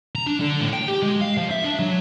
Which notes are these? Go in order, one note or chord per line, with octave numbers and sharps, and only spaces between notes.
A#5
D4
D3
A2
G5
G4
G#3
F5
F3
E5
D4
F#3